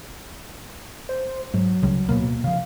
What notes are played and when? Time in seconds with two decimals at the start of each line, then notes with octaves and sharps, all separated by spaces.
1.09 C5
1.54 G#2 F#3
1.83 C#2 C#3 G3
2.09 D1 B2 A#3 B3
2.44 C#3 F3 F5